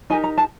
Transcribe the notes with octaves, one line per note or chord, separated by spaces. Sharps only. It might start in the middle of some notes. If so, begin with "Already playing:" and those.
D#4 G4 A#4 G#5
A#5
A5